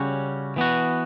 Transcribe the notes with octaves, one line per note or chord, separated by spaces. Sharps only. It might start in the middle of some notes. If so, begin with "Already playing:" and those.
Already playing: C#3 G3 C#4 F#4 C#5
E3 B3 F#4